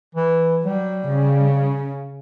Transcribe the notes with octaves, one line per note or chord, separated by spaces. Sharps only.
E3
F#3 G3
C#3